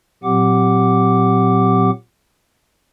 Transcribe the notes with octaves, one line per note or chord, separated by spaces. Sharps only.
A#2 F#3 C4 G4 F#5 D6